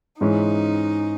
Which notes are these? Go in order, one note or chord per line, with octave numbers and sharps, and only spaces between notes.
G#2 E3 G#3 C#4 D#4